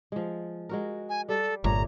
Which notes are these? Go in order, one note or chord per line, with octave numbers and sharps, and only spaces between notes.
F3 G#3
G#3 F#4 A#4
G#5
G3 A4
G1 A#2 A3 C#5 A#5